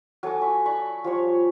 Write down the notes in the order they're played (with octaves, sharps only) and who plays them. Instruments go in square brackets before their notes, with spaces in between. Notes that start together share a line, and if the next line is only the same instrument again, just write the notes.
[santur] F#3 A4 G#5 D6
B5 C#6
D5 B5 C#6
F3 G3 C#5